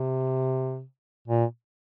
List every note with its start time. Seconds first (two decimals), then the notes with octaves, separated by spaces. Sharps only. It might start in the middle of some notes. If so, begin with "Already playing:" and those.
Already playing: C3
1.28 A#2